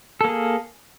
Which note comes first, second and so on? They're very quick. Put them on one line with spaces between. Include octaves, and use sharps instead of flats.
A4 A#3 G#4